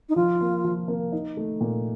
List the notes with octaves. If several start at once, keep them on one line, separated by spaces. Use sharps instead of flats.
D#4
F3 F4
A#3
F3
A#3
D#4
A3
A#2